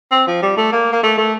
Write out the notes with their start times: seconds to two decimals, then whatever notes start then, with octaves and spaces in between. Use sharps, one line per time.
0.11 C4
0.27 F3
0.42 G3
0.57 A3
0.72 A#3
0.93 A#3
1.03 A3
1.18 A3